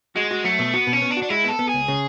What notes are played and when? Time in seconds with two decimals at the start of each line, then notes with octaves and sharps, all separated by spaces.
0.16 G#3 F#4
0.31 F#4
0.45 F#3 A3
0.59 B2
0.74 B3 F#4
0.87 B2
0.93 C#4
1.02 B3
1.11 D4
1.17 F#4
1.23 D4
1.30 G#3 E4
1.44 B3 A4
1.59 B3
1.69 C#2 G#4
1.88 C#3